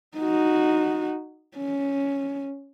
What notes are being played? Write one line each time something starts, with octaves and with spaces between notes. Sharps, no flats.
D#4 F#4
C#4